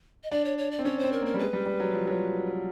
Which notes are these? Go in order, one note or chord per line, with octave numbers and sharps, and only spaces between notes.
D#5
D4 D5
C#5
C#5
D5
C4
C#4 C#5
C4 C5
A#4
A#3
A#4
G3
G#3 B4
G3
G3
F#3
F3
F#3
F3